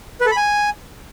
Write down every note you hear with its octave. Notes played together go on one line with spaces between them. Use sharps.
B4
A4
B5
G#5